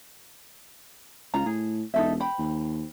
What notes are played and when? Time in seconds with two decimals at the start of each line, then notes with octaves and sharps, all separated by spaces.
1.34 C#2 F4 A#5
1.46 A2 G#4
1.94 E1 D#4 A4 E5
2.20 C5 G5 B5
2.39 D#2